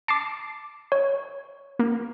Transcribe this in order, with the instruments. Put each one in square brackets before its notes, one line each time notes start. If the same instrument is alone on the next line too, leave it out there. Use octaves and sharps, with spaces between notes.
[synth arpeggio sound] A5 C7 [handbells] D6 D7
[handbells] C#5
[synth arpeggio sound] A#3